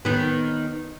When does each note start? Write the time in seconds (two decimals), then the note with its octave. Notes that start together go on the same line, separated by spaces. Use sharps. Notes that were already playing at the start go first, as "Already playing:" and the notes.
0.05 D#3 B3